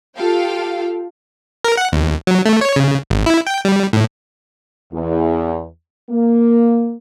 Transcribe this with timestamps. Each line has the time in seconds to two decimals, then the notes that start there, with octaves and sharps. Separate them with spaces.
0.17 F4 G4 A4 F5 G5
1.64 A#4
1.77 F#5
1.92 D#2
2.27 F#3
2.45 A3
2.61 C#5
2.76 C#3
3.10 G#1
3.26 E4
3.47 G5
3.65 G3
3.93 A2
4.93 E2
6.10 A#3